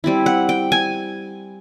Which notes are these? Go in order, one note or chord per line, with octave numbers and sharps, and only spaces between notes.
G3 C4 E4
F#5
G5
G#5